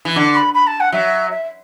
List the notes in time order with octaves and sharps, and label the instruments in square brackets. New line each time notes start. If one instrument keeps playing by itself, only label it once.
[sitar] E3
[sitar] D3 [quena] D6
[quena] B5
B5
A5
F#5
[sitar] F#3 [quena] E5
[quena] E5